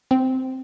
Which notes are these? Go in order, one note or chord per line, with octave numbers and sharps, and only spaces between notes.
C4